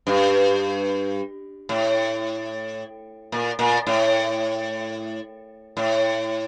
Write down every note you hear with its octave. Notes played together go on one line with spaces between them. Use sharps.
G2
A2
A#2
A#2
A2
A2